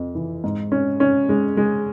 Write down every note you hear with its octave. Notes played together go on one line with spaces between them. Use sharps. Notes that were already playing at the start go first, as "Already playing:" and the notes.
Already playing: F2
E3
G#2
C#4
C#4
G#3
G#3